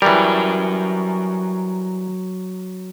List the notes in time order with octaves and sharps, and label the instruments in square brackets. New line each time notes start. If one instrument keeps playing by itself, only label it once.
[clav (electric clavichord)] E3 G3 [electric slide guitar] F#3 A#4